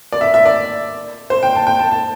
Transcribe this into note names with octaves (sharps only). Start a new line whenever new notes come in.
D5
E5
E5
D5
C5
G5
A5
G5
A5
A5